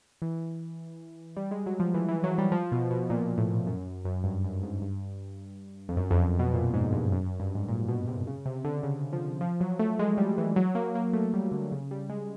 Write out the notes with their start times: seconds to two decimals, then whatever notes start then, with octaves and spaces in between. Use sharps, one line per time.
0.22 E3
1.37 G3
1.51 G#3
1.66 F#3
1.80 F3
1.94 E3
2.09 E3
2.24 F#3
2.38 G3
2.52 F3
2.72 B2
2.90 B2
3.10 A#2
3.38 A2
3.67 F#2
4.05 F#2
4.24 G2
4.44 F#2
4.63 G#2
4.82 G2
5.89 F2
5.97 F#2
6.11 F2
6.26 F2
6.39 B2
6.54 A#2
6.74 G#2
6.92 G2
7.12 F#2
7.26 F#2
7.40 G2
7.55 G#2
7.69 A#2
7.88 B2
8.08 C3
8.27 C#3
8.46 C3
8.65 D3
8.83 C#3
9.13 F3
9.41 F3
9.61 F#3
9.79 A3
9.99 G#3
10.18 G3
10.38 E3
10.56 F#3
10.75 A#3
10.95 A#3
11.13 A3
11.34 G3
11.52 D3
11.72 C#3
11.91 G3
12.09 G#3